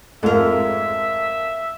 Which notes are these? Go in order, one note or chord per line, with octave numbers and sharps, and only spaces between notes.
F2 G#2 F4 A4 A#4 E5